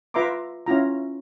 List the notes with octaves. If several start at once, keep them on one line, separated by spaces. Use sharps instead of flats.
F4 B4 E5 A#5 C6 D6
C#4 E4 F4 A#5